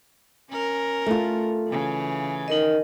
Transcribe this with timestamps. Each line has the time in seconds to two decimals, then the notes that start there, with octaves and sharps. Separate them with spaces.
0.50 C#4 A#4
1.06 A3 F4
1.67 C#3 E3
2.48 D#4 A#4 D#5